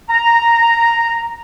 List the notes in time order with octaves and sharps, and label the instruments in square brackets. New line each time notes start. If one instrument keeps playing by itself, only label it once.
[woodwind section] A#5